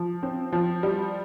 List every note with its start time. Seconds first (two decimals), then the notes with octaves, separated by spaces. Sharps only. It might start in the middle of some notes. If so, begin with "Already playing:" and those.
Already playing: F3
0.23 C4
0.52 F3
0.83 G3